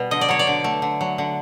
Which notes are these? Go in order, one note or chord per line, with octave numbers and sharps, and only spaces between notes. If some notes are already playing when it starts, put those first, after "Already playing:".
Already playing: B2 G3
D3 D#5
D5
F#3 C#5
D5
D3
A3
D3
F#3
D3